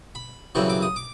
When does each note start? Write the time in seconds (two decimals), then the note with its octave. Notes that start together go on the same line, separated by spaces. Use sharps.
0.15 B5
0.55 F#2 C#3 E3 G3 C4 C#6
0.70 D6
0.82 D#6
0.96 D6